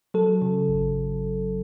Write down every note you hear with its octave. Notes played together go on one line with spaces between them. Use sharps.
F#3 A4
C#3
G#1